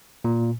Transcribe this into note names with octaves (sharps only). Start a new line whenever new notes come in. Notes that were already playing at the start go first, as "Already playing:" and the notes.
A#2